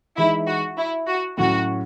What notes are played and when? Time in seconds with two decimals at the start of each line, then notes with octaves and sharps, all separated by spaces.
0.17 E3 G#3 D#4 E4
0.47 F#4
0.78 E4
1.07 F#4
1.38 A2 F#3 C#4 E4 F#4